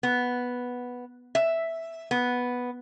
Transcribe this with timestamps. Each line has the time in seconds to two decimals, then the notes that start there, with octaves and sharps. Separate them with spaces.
0.03 B3
1.35 E5
2.11 B3